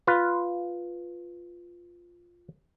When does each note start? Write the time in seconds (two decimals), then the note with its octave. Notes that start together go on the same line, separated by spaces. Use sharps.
0.07 F4 B4